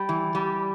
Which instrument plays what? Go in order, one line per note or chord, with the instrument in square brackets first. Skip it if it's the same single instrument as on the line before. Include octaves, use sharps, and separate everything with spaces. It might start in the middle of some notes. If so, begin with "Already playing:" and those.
Already playing: [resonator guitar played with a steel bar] G3 [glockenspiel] B5
[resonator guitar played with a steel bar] E3
G3